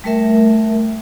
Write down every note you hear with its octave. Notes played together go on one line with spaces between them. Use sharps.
G3 A3 A#4 E5